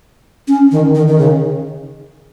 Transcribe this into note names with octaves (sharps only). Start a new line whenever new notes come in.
C#4
D#3
D#3
D#3
C#3